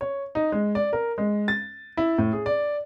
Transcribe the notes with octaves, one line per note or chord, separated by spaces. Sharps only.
C#5
D#4
G#3
D5
A#4
G#3
A6
E4
A2
G#4
D5